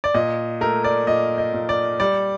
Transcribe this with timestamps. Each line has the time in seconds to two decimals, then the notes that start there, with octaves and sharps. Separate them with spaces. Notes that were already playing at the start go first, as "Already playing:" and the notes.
0.04 D5
0.14 A#2 D#5
0.61 A3 A#4
0.84 D5
1.07 A#2 D#5
1.38 D#5
1.54 A#2
1.69 D5
2.00 G3 D5